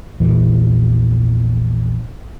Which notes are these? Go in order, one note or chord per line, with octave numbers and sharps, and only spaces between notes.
A#1 E2 A#2 E3